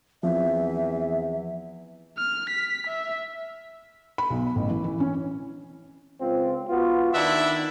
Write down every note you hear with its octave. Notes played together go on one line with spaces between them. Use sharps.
E2 F3 C4 E5
F6
B6
E5
B5
B1
A1
E3
E3
C#4
C#2 C4 F4
B3 F4 F#4
D#3 D4 E4 E5